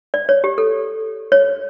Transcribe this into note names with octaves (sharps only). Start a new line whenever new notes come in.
D5
C#5
G4
A4
C#5